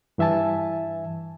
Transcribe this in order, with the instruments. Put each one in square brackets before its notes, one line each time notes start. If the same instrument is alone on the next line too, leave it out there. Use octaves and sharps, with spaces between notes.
[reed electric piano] G2 E3 E5 G#5 A5